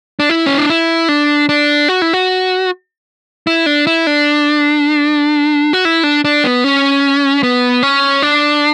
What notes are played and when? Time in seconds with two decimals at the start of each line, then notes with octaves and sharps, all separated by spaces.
0.20 D4
0.29 E4
0.46 C#4
0.58 D4
0.70 E4
1.09 D4
1.49 D4
1.89 F#4
2.02 E4
2.13 F#4
3.47 E4
3.66 D4
3.87 E4
4.07 D4
5.73 F#4
5.85 E4
6.04 D4
6.25 D4
6.44 B3
6.64 C#4
7.43 B3
7.83 C#4
8.22 D4